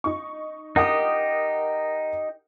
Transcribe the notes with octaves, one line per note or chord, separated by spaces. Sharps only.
D#4 C#6
D#4 G4 A#4 F#5 D#6